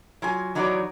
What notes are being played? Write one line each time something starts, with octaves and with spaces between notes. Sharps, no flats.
F#3 F4 G#5
E3 F#3 D#4 F#4 C#5 D5